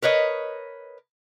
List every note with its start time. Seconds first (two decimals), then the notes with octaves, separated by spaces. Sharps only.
0.02 A#4 B4 C#5 D#5